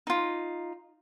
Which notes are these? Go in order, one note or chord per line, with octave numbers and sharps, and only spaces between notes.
D#4 F4